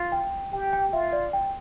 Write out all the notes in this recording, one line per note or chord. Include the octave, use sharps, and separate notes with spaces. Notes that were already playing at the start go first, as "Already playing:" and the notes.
Already playing: F4
G5
G4 G5
G5
F4 E5
D5
G5